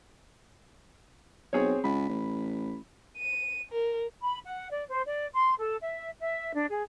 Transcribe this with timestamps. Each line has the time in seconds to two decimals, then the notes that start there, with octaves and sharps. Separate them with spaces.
1.53 B1 C4 G#4 C#5
1.84 C#2 B5
2.09 A1
3.18 D#7
3.71 A#4
4.22 B5
4.44 F#5
4.71 D5
4.89 C5
5.07 D5
5.34 C6
5.60 A4
5.82 E5
6.20 E5
6.54 D4
6.70 G#4